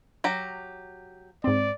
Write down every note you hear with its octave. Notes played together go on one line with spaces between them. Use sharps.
F#3 G4 A#5
G#2 C4 D5